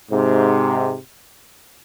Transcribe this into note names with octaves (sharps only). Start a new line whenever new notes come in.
G#2 C3